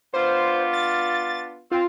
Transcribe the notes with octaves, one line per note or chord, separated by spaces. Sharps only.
B3 D4 F4 C5
A6
C4 F4